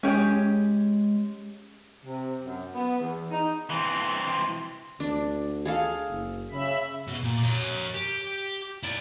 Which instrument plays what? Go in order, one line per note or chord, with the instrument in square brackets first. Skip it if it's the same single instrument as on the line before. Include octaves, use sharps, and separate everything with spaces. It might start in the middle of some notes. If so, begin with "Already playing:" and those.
[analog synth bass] G#3 [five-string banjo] C#4 G4 G#4
[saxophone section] C3
F#2
B3
E2
D#4
[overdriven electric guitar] E3 C4
[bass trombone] D2 [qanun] D4
[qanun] G#4 A4 F5
[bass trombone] F#1
[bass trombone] C#3 [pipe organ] E5 B5
[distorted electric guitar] B2
A#2
A#4 C#5
G4
E4 D5